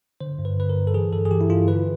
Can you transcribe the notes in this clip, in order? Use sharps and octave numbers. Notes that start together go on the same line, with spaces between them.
D3 C5
G2
B4
D3 B4
A#4
G2
A4
E3 G#4
G2 A4
G#4
E3 G4
E4
G2 F4
D3 B4